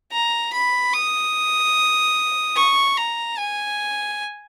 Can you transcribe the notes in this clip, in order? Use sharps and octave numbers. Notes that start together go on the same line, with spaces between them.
A#5
B5
D#6
C#6
A#5
G#5